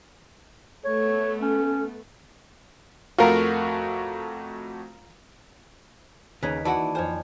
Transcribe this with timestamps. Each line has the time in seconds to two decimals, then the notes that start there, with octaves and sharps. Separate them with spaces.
0.85 A3 B3 A4 C#5
1.42 C#4
3.18 F2 A3 F4 F#4 A#4
6.43 D#2 C#3 B4 C#5 A#5 B6
6.65 E3 E4 F#4 D5 F#5 A5
6.95 F2 F4 C5 C#5 G#5